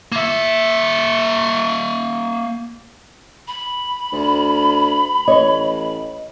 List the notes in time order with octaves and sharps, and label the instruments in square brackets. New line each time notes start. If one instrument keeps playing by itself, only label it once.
[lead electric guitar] A#3 E5
[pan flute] B5
[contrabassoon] D2
[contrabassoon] A1 [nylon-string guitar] C#5 [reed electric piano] D#5